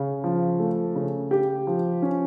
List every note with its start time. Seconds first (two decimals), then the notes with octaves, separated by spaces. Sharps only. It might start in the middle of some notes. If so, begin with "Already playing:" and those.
Already playing: C#3
0.24 F3
0.59 A3
0.95 C#3
1.31 G4
1.67 F3
2.02 C#4